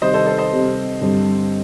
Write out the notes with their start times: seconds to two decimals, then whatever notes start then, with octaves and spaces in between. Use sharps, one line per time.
0.01 C3 D#3 G3 C5 D#5
0.14 A4 C5
0.27 A4 C5
0.38 C5 D#5
0.51 C3 G3 C4 G4
1.01 G2 D3 G3 C4